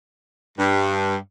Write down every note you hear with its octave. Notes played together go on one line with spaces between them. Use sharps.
G2